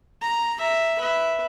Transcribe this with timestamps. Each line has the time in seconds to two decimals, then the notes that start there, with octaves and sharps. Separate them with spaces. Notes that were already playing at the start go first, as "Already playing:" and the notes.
0.22 A#5
0.58 E5 A#5
0.99 B4 E5